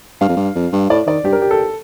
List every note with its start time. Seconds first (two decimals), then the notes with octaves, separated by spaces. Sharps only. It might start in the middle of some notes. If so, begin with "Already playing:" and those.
0.21 G2 F5
0.29 F2
0.37 G2
0.56 F2
0.73 G2
0.90 A2 D5
1.07 D#3 D5
1.24 G2 G4
1.33 A#4
1.42 G4
1.51 A4